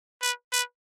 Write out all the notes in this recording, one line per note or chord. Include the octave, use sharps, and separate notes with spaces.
B4
B4